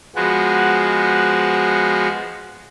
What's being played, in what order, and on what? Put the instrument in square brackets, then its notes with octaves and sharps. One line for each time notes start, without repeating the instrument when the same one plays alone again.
[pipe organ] F3 G#3 B3 F#4